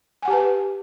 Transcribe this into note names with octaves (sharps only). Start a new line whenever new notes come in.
G4 B4 F#5 G#5 A5